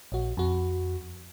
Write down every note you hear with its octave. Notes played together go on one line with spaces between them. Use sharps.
A#1 F#4
F2 F#4